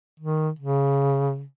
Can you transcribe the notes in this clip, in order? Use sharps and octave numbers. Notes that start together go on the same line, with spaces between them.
D#3
C#3